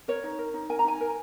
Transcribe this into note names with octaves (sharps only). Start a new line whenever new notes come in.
A#4 C#5
D#4
A#4
D#4
A#4 G#5
A#5
D#4 G#5
A#4